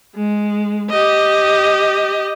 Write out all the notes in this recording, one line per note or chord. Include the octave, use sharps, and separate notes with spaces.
G#3
G4 D#5